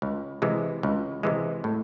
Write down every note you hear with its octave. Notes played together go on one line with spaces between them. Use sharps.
C#2
C3 E3 G#3
C#2
C3 E3 G#3
A2